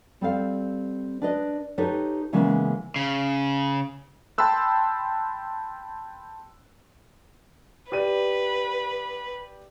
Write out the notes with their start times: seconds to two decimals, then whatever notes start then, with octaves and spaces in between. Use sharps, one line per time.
0.21 G3 C4 A4 F5
1.22 D4 B4 D#5
1.78 D#4 G4 A4 B4 C#5
2.33 C#3 E3 G#3 A#3 B3 C#4
2.96 C#3
4.38 G5 A5 B5 C6 E6 F#6
7.92 G4 B4 D5 D#7